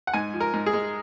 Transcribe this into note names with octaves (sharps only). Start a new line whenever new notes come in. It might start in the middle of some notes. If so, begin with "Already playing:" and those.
F#5
G#2 G#5
F3
A#4
G#2
G#4
G#3